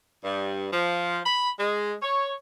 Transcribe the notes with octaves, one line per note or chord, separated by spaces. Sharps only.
G2
F3
B5
G#3
C#5